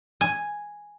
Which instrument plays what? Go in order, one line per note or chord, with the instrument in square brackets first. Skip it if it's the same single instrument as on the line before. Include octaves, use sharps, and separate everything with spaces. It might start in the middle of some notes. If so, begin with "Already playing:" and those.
[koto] G#5